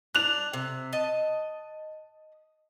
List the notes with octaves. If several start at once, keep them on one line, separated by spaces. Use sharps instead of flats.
D4 F#6 F7
C3
D#5 A5